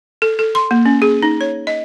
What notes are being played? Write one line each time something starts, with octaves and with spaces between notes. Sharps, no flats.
A4
A4
C6
A#3
C#4
G#4
D#4
C#5
D#5